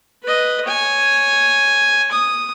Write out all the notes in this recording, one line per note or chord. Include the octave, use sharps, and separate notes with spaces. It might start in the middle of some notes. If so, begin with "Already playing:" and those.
B4 D#5
C#5 G#5
D#6